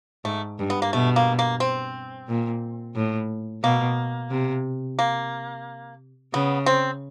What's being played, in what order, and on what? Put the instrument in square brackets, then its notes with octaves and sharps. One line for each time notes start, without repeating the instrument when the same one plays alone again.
[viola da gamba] G#2 [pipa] A3
[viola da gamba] G2
[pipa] B3
A#3
[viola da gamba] B2 [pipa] A3
[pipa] A#3
A#3
C4
[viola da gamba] A#2
A2
[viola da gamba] B2 [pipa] A#3
[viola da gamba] C3
[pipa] A#3
[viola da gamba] C#3 [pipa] B3
[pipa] C4